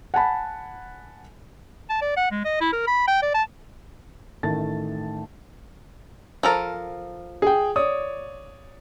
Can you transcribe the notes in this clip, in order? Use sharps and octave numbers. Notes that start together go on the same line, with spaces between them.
F#5 G#5 A5 B5
A5
D5
F#5
G#3
D#5
E4
A#4
B5
G5
D5
A5
A1 D#3 A3 A5 A6
F3 A4 A#4
G#4 G5
C#5 D5 D#6